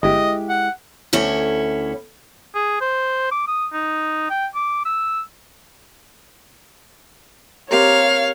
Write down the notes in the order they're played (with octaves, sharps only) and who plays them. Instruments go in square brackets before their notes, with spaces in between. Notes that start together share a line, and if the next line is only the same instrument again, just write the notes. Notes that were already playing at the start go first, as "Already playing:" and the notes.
[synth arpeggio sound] G1 [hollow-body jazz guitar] G#3 E4 G4 [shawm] D#5
[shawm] F#5
[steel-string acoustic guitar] D2 C#4 E4 C#5
[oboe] G#4
C5
D6
D#6
D#4
G5
D6
E6
[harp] C4 G4 A#4 [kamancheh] C#5 [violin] F5